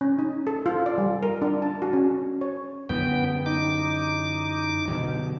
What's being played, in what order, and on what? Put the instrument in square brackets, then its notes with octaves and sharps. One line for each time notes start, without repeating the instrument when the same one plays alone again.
[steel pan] C#4
D#4
A4
F4
D5
G3
A#4
D4
A5
F#4
C#4
C#5
[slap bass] F#2 D3 E3 [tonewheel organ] B3 G5
[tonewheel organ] D#4 D6
[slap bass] B2 D3 F#3